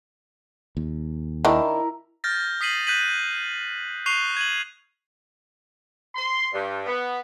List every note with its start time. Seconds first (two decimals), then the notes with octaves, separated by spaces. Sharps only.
0.77 D#2
1.45 D#3 D4 E4 A#4
2.24 F6 G6 A6 A#6
2.61 D#6 B6 C7 D#7 F#7
2.87 F#6 G6 B6 D#7 F#7
4.06 C#6 F#6 C7 D#7 F7 G7
4.37 G#6 D#7 F#7
6.15 C6
6.53 G2
6.86 B3